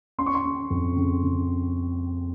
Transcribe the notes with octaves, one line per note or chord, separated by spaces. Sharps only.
C#4 C6
C#6
C6
C#4
F2
C#3
C#3